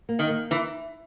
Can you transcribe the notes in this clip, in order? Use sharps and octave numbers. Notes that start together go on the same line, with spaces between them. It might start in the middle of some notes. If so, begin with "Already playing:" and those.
A#3
D#3
A#3
E3 D#4